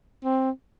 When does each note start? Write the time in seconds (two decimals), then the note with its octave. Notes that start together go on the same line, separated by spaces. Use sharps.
0.24 C4